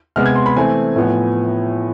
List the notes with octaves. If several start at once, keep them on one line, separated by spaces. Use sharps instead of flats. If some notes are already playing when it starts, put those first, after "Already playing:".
C3 G#3 B3 F6
G#6
C6
B5
E3 A3 C4 G#5
A2 F3 B3